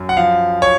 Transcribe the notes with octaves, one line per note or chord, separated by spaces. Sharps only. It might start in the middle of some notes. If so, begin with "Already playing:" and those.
Already playing: F#2
F#5
F3 F5
C#5